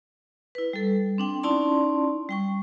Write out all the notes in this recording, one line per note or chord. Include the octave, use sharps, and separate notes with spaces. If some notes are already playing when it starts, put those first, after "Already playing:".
E4 B4
G3 A4
C4 D4 G5
C#4 D#4 E4 D5 A5 C6
G3 G5 C#6